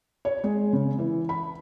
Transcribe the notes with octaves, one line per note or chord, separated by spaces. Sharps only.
C#5
G#3
C#3
E3
B5